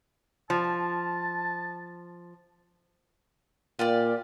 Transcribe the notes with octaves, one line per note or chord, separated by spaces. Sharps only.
F3 A5
A#2 F4 G4 D5